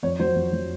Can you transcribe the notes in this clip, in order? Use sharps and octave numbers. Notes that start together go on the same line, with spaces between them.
F2 C#5
F#3 C5
F2
F#3